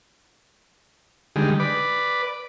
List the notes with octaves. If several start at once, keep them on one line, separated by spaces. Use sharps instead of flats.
D3 D#3 G3 G#3
B4 D5